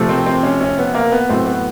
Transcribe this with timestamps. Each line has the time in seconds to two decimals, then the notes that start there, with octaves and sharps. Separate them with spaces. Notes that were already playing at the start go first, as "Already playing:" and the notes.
Already playing: C3 F3 A3
0.09 C4
0.26 C4
0.43 C#4
0.61 C#4
0.78 B3
0.94 A#3
1.12 B3
1.29 A2 F#3 A3 C4
1.46 B3